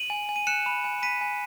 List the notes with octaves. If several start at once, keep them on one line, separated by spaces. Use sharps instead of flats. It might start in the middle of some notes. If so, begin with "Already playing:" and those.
Already playing: D#7 F#7
G#5
G#5
D#7
F#6 C#7 E7
B5
G#5
B5 B6 D#7
G#5